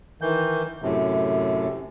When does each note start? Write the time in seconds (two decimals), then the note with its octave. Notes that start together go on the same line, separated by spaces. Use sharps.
0.21 D#3 E3 G6
0.82 F#2 A2 C3